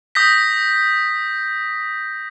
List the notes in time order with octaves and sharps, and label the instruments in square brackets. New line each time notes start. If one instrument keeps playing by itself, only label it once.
[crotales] D#6 G6 A#6 B6